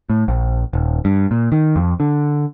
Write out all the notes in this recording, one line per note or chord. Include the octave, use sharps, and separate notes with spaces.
A2
A#1
D#1
G2
A#2
D#3
F2
D3